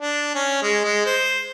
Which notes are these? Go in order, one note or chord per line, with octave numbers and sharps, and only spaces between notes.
D4
C#4
G#3
G#3
C5